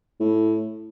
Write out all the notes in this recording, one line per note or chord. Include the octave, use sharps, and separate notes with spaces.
A2